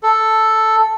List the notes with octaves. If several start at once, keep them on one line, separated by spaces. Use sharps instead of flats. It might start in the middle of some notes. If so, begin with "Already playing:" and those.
A4